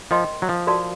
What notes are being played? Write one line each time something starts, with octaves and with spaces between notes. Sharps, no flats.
F3 A#4 D#5 G5 C6
F#3
F3
F#4 A#4 D5 F5 A5